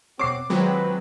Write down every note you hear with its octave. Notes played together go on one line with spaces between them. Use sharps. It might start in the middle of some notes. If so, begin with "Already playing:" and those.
B2 C4 F#4 C#5 D6 C7
D#3 F#3 G#3 C4 F4 B4